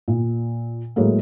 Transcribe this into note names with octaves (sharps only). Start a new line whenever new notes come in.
A#2
A2 F#3 G#3 A#3